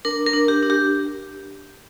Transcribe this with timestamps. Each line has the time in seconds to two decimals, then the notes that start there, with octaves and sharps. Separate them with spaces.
0.05 D4 A#4
0.26 A#4
0.34 D4
0.48 G4
0.63 D4
0.70 G4